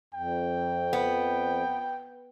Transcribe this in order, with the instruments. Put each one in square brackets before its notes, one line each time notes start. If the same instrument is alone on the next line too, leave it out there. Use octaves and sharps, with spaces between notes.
[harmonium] F2 [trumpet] G5
[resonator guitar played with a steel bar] B3